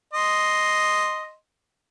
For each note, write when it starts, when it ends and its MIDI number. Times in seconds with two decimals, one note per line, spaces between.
0.14 1.34 75
0.14 1.34 84